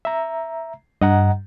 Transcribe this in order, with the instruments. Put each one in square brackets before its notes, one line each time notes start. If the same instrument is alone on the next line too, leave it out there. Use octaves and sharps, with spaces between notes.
[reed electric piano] E5 A#5
[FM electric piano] G2 [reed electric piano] D#5 F#5 A#5